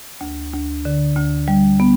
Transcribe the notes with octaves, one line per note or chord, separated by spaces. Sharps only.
D2
D2
D3
D2
G3
B3